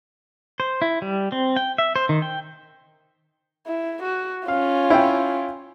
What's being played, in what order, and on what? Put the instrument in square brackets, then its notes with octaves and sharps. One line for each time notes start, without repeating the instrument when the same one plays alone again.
[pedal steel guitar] C5
E4
G3
C4
G5
E5
C5
D#3
G5
[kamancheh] E4
F#4
[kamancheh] C#4 F4 [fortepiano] F5
[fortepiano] E4 G5